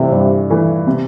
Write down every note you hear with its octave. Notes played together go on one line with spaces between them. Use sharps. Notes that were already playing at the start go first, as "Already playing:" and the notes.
Already playing: G2 C3 E3 A3 E4
G2
E3 A3 E4
C3